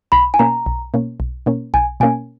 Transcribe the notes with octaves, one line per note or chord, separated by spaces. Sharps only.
B1 B5
G#5
B2 A#3 C#4 A#5
B1
B2 A#3 C#4
B1
B2 A#3 C#4
B1 G#5
B2 A#3 C#4 G#5